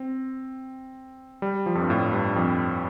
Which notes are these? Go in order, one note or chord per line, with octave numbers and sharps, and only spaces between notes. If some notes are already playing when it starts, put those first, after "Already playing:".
Already playing: C4
G3
F3
F2
G2
A2
G2
F2